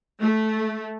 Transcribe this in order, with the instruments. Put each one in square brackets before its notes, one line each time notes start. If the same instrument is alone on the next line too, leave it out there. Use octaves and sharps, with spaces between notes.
[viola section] A3